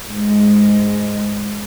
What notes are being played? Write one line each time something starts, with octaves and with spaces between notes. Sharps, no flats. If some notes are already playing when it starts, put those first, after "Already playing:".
G#2 G#3